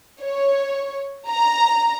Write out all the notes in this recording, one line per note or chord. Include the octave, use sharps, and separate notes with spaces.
C#5
A#5